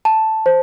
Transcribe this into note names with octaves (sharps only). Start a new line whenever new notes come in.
A5
C5